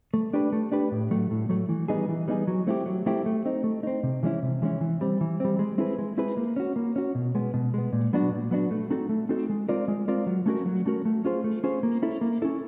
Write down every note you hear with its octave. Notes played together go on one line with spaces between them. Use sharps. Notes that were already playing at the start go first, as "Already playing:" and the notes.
A3
D4 G4 B4
A3
D4 G4 B4
A2
F#3 A3
A2
F#3 A3
E3
G3 B3 D#4 G#4
E3
G3 B3 D#4 G#4
F#3
A3 C4 E4 G4
F#3
A3 C4 E4 G4
A3
C4 D#4
A3
C4 D#4
C3
E3 G#3 C#4 E4
C3
E3 G#3 C#4 E4
E3
G3 C4
E3
G3 C4
G#3
C4 E4 G#4 B4
G#3
C4 E4 G#4 B4
A#3
C#4 F#4
A#3
C#4 F#4
B2
G#3 B3
B2
G#3 B3
A#2
F#3 B3 D4 F#4
A#2
F#3 B3 D4 F#4
A3
C4 D#4 F#4 A4
A3
C4 D#4 F#4 A4
G#3
C4 F4 A#4 D5
G#3
C4 F4 A#4 D5
F#3
A3 C#4 F#4 A#4
F#3
A3 C#4 F#4 A#4
A3
C#4 F4 G#4 C5
A3
C#4 F4 G#4 C5
A#3
C#4 E4 A4
A#3
C#4 E4 A4